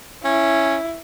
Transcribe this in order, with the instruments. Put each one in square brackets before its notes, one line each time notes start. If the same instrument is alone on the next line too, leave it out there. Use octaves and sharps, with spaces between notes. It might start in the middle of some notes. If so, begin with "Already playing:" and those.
[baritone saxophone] C#4 [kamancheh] E4